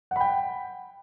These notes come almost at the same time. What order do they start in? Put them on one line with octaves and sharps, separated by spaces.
F#5 B5 G5